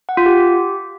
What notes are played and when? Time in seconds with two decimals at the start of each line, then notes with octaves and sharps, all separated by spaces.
0.09 F#5
0.17 F4
0.26 G4